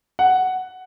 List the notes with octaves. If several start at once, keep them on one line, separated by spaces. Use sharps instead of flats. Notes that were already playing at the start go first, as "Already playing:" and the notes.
F#5